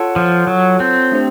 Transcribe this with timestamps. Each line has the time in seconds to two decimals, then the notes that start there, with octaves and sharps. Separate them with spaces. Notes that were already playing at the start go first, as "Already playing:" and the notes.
Already playing: F4 A4 C#5 F#5 A5
0.16 F3
0.47 F#3
0.80 C4
1.12 A3 D4 G4 C5